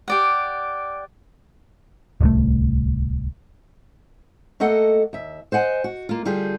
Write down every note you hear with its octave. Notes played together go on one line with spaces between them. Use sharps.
G4 D5 F#5
D1 C2 A3
A3 A#3 A4 D#5 F#5
D#2 E5
C5 D#5 F#5 G#5
F#4
A#3 F4
D3 G3 F4 G4 G#4